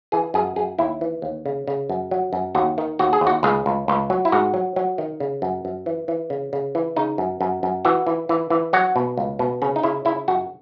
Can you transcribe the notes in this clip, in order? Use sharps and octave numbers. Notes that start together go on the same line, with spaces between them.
E3 G#4
F#2 G#4
F#2 G#4
D#2 E4
E3
D#2
C#3
C#3
F#2
F#3
F#2
D#2 F#4
D#3
D#2 F#4
G#4
D#2
F#4
C#2 G#4
C#2
C#2
F#3
E4
G#2 F#4
F#3
F#3
D#3
C#3
F#2
F#2
E3
E3
C#3
C#3
E3
C#3 D#4
F#2
F#2
F#2
E3 F#4
E3
E3
E3
F#3 F#4
B2
C#2
B2
C#3 C#4
D#4
C#3 E4
C#3 E4
F#2 F#4